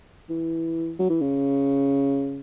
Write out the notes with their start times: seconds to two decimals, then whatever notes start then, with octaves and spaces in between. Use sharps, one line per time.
0.30 E3
0.99 F#3
1.10 E3
1.21 C#3